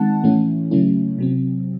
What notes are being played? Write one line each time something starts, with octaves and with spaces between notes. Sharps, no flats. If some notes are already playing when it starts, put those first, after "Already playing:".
Already playing: D#3 G#3 C4 D#4 F#5 A5
A2 E3 A3 C#4 E4
C#3 F#3 A3 C#4 E4
C3 F#3 C4